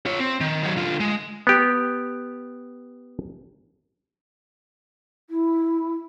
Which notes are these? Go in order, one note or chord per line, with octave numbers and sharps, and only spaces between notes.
F4 C#5
C4
D#3
D#3 F#3
D3 F4
G#3
B3 G4
E4